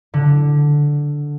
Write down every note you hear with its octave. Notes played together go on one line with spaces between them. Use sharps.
D3